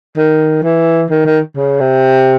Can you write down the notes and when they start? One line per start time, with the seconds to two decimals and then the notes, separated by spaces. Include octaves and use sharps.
0.17 D#3
0.63 E3
1.10 D#3
1.26 D#3
1.57 C#3
1.80 C3